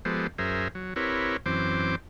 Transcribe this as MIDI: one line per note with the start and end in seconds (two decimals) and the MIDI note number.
0.05 0.27 53
0.05 0.27 56
0.05 0.27 59
0.05 0.27 67
0.05 0.27 69
0.05 0.27 72
0.38 0.68 42
0.38 0.68 68
0.38 0.68 70
0.38 0.68 72
0.38 0.68 76
0.75 0.94 54
0.96 1.37 60
0.96 1.37 64
0.96 1.37 67
0.96 1.37 70
0.96 1.37 71
0.96 1.37 73
1.46 1.95 42
1.46 1.95 52
1.46 1.95 60
1.46 1.95 72
1.46 1.95 86